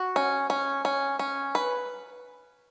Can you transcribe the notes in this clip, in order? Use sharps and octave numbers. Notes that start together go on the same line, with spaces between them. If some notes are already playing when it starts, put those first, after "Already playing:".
Already playing: F#4
C#4
C#4
C#4
C#4
B4